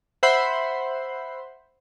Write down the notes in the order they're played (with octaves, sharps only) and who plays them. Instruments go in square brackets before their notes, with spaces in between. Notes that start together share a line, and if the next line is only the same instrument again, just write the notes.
[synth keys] C5 E5 F#5 B5 C6 C7